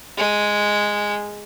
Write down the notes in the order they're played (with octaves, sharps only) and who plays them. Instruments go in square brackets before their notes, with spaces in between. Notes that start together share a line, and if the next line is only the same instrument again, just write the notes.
[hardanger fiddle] G#3